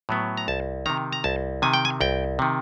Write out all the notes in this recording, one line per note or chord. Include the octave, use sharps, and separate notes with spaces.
A2 F#3 B3
A#5
C2 A5
C3 D#3 A#5
A#5
C2 A5
C3 D#3 G#5
G5
G#5
C2 G5
C3 D#3